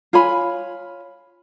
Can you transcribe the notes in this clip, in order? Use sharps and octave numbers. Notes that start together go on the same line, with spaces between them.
F4 C#5 G#5 B5